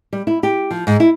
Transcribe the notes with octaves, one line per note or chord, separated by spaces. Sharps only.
G3
E4
G4
F3
G#2
E4